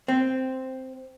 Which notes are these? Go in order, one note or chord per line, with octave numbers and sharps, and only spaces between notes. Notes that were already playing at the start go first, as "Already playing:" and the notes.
C4